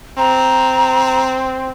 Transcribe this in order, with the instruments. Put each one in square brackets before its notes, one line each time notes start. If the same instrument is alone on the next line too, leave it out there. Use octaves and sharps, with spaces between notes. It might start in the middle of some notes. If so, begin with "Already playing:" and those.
[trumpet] C4 [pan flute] A#5